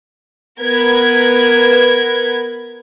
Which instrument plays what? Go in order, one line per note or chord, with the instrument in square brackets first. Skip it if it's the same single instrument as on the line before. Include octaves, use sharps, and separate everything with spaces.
[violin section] B3 A#4 B4 G#6